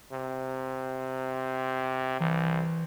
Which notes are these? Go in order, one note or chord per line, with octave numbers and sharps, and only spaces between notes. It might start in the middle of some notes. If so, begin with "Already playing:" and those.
C3
C2 E3